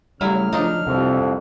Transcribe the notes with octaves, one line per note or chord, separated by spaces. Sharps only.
A2 C#3 F#3 G3 E4 F6
F3 D4 D#4
C2 F2 C3 A4